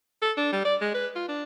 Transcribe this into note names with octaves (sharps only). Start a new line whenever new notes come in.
A4
D4
G3
D5
G#3
B4
F4
D4